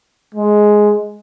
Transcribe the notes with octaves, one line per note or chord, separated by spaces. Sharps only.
G#3